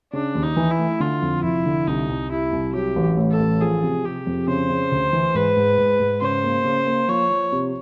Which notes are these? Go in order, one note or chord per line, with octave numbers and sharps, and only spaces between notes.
C#3 D4
D#2
D#4
E3
E4
A3
D3 F4
F2
F1 E4
D3
C2 D#4
C2
G3 E4
C2
F#3 G4
A1
A2
A4
A1
F3 G#4
C3
C3 G4
F2
C#3 C5
C#3
D2
E3
G#2 B4
G#2
G#2
G#2
C#3 C5
A#3
C#3
A#3
F3 C#5
F3
C3